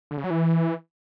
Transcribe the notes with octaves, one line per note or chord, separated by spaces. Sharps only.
D3
C#3
F#3
E3